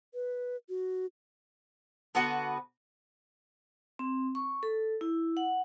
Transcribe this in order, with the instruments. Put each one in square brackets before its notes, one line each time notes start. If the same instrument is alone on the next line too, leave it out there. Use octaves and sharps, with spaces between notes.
[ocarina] B4
F#4
[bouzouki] D3 B3 F#4 B4
[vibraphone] C4
C#6
A4
E4
F#5